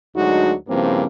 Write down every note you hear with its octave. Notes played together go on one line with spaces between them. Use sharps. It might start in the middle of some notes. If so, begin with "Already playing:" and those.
D2 F#3 G#3 D4 D#4 F#4
G2 C#3 F3 A#3 C4 E4